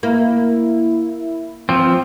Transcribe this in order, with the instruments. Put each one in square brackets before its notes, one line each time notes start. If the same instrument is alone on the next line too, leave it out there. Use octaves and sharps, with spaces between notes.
[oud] A#3 [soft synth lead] E4
[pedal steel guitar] F3 C4